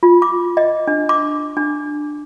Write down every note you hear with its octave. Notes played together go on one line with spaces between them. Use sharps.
F4
D6
D#5
D4
D6
D4